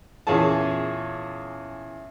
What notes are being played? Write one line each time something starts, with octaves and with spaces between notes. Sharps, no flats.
E2 A#2 C#4 G#4 A5